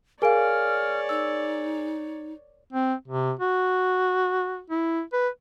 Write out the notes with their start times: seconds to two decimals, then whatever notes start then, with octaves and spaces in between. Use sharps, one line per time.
0.22 G#4 A#4 C#5 D5 F5 G#5 F6 D7
1.09 D#4 E6
2.73 C4
3.08 C3
3.39 F#4
4.70 E4
5.13 B4